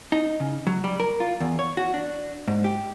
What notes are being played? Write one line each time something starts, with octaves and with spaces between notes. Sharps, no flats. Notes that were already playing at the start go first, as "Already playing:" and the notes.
D#4
C#3
F#3
G3
A#4
F4
E2
C#5
F#4
D4
G#2
G4